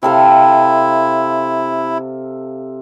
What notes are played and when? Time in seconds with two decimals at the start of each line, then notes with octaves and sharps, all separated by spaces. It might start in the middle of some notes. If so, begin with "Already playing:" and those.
0.03 C3 E4 A4 F5